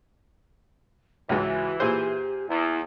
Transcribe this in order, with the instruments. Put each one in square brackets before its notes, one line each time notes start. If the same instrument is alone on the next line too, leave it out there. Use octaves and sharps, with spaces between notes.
[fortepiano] C#2 G#2 [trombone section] E3 [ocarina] F#4
[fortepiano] A#2 G#4 C5 [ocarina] G4
[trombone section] E2 [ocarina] E4